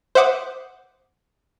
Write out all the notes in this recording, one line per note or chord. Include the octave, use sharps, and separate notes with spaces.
C5 E5 F#5 D6 D#6